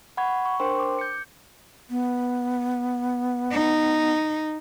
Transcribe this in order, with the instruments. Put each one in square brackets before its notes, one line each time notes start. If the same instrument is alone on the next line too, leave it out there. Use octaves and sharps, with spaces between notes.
[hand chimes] F#5 B5 C#6 G#6
C#6
D4 A#4 C5 G5 C6
D6
G6 C#7
[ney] B3
[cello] D#4